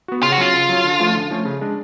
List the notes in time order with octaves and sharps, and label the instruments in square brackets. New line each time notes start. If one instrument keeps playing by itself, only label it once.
[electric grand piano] B3 F#4
[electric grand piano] C#3 [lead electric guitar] F4
[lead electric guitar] F#4
[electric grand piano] F#3 C#4 [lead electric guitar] F4
[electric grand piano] C#3
F#3 C#4
D3
F3 A3 C#4
D3
F3 A3 C#4
C#3
G#3 D4